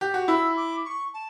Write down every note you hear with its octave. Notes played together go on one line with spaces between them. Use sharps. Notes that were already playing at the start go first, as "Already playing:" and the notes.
G4
F#4
E4 E6
D6
C#6
A5